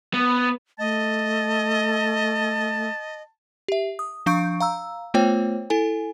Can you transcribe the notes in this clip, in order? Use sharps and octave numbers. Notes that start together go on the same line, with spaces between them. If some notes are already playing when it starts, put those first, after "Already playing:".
B3
A3 D#5 A5
G4 E5
D#6
F3 D4 F5 C#6 G6 D7
F5 A#5 E6
A3 B3 F4 C5 C#5 G5
E4 A4 G#5